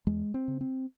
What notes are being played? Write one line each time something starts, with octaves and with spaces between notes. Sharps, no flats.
E2 G#3
C4
C#3
C4